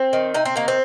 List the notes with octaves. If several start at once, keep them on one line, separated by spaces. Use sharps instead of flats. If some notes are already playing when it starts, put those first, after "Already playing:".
Already playing: C4
D#3
C3 D#4
C4
D#3 A#3
C4